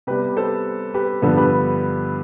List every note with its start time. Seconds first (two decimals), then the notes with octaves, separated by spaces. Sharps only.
0.07 C3 G3 B3 G4 B4
0.37 A4 C5
0.94 G4 B4
1.22 G2 D3 F3 B3 A4
1.37 G4 B4